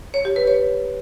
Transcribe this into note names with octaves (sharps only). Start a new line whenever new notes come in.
C#5
G4
B4
C#5